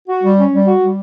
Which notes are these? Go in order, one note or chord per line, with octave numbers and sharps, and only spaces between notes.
F#4
G3
C#4
G3
F#4
G3